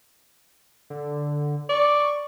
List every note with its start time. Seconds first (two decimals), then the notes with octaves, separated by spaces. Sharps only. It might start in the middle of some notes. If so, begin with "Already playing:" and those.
0.90 D3
1.69 D5 C#6